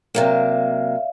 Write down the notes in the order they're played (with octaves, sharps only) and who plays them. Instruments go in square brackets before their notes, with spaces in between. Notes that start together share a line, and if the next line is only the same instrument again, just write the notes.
[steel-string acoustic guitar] C3 F#3 A#3 [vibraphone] D5 E5 F5